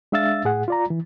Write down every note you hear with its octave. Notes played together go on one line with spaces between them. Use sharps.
G#3 D4 E5 F5 E6 A6
A2 G#4 F#5
F4 D5 A#5
E3